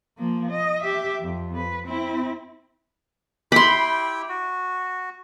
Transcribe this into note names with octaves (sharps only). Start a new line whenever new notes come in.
F3 A#3
D#5
G4 E5
F2
B4
C4 E4
E4 G4 G5 B5 C6
F#4